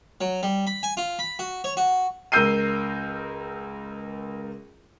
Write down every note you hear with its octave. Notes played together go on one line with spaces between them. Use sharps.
F#3
G3
B5
G#5
F4
B5
F#4
C#5
F#4
C#2 A#4 E6 G6 C7 D#7